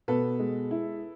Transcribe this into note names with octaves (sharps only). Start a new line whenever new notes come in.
B2 A4 B4
G#3
E4